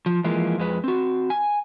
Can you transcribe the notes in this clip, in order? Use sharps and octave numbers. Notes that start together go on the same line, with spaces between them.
F3
E3 F3 G#3 A#3
F2 G#3 B4
C4 F#4
G#5